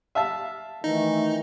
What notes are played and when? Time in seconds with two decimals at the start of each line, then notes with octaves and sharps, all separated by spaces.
0.15 E5 F5 A5
0.84 D#3 E3 A3 D#4